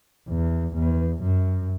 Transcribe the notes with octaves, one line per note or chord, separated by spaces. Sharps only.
E2
E2
F#2